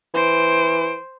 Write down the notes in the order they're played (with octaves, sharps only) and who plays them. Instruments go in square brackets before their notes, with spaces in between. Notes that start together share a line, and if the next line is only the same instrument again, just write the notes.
[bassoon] E3 [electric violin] C5 D7